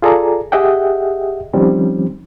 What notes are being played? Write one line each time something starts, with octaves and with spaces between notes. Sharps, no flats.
F4 G#4 A4 D5 A#5
G4 G#4 D#5 E5 F#5 G5
D#3 F3 G3 C4 C#4